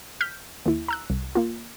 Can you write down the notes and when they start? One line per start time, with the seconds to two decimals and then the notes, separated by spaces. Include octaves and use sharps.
0.21 F6 G6 B6
0.66 D#2 E4
0.88 A#5 E6 F#6
1.10 C2
1.35 A#3 F4